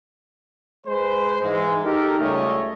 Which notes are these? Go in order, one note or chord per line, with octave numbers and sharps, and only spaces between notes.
G#3 B4 C5
G#2 E3 G#3
D#4 G4 A4 A#4
C#2 G3 A3 C#5 D#5